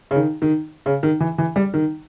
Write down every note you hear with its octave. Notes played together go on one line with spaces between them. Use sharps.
C#3
D#3
D#3
C#3
D#3
E3
E3
G3
D#3